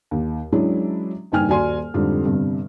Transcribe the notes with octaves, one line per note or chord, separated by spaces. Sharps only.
D#2
E3 F#3 G#3 C#4 D4 E4
F#1 G2 D#3 G5 G#5 F6
D#1 F#4 D5 G#5 C6
F2 G#2 D3 G3 C4
G1 G2 C3